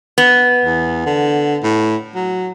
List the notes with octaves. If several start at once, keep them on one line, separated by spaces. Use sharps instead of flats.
B3
E2
D3
A2
F#3